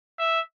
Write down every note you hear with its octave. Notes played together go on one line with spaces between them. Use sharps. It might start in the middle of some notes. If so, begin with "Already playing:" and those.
E5